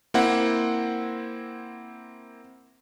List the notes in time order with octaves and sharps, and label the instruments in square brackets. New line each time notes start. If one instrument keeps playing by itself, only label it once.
[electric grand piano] A#3 C4 E4 F#5